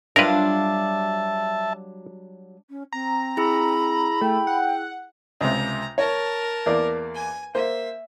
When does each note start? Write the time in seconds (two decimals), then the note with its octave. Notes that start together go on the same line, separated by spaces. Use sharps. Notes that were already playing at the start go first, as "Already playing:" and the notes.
0.16 F#3 G3 D4 F4 A#4 B4 E5 A5
2.68 C#4
2.92 C4 A#5
3.37 E4 G#4 B5 E6
4.21 A3 G5
4.47 F#5
5.41 C#2 C3 A#5
5.98 A#4 C#5 A5
6.66 E2 A#3 D5
7.15 G#5
7.55 A#3 C5 E5